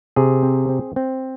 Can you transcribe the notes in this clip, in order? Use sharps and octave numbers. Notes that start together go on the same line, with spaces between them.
C3 G#4
C4
C4
C4